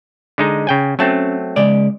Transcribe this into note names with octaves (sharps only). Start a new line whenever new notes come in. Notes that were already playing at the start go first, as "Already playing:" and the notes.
D3 G#3 D#4
C#3 G5 G#5
F#3 A3 C4 C#4 A5
C#3 G#3 D5